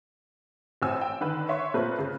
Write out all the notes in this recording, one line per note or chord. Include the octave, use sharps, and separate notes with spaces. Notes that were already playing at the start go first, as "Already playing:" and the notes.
A1 A2 C4 G#5 E6
G5
D3 D#3 B4
C#5 E5 C6 C#6
A#2 A3 C4 B4 C5
C#3